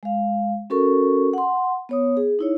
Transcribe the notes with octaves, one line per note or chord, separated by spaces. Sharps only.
G#3 F5
C#4 F#4 A4 A#4 C#6
F#5 C6
B3 C#5 D#6
G#4
D#4 E4 C#5